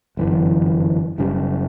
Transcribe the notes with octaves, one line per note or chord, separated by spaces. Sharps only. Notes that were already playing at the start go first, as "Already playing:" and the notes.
G1 F#2 E3
F#1 F#2 C#3 G3